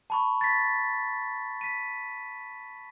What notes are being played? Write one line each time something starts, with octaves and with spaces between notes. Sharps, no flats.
A5 B5 C#6
A6 B6
B6 D#7